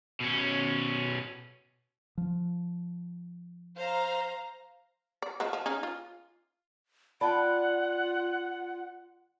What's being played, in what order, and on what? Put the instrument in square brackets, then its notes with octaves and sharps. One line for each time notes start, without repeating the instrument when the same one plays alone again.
[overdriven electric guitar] B2 C#4
[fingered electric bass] F3
[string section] C5 F5 A#5
[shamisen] D5
F3 F#3 G#3
F3
C#4 D#4 G#4
F4
[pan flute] F4 [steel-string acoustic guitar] D5 G5 [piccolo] F#5 [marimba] A5 B5